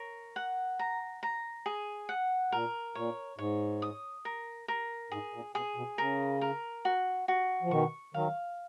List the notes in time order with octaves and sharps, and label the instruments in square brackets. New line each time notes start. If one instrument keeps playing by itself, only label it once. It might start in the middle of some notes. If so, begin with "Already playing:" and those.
Already playing: [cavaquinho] A#4 C#5
F#5
A#5
A#5
G#4
F#5
[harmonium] A#2 [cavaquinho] A#4
[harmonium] A#2 [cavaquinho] C#5
[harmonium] G#2 [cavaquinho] C#5
[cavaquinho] D#6
A#4
A#4
[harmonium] G#2 [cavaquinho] G#4
[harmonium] A#2
[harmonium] B2 [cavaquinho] G#4
[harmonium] B2
[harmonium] C#3 [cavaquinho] A#4
[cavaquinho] A#4
F#4
F#4
[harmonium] F3
[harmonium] B2 D#3 [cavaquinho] C#6
[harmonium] D#3 F#3 [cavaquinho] F5